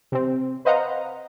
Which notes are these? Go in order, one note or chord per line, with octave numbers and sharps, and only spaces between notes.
C3 C4
B4 C5 D#5 F5 F#5 A#5